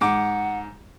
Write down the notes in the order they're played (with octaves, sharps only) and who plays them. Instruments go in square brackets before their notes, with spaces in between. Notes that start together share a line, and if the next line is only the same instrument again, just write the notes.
[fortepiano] G#2 D6 [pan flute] F#5